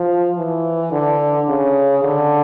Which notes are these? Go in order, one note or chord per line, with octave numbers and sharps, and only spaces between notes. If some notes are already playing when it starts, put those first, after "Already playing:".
Already playing: F3
E3
D3
C#3
D3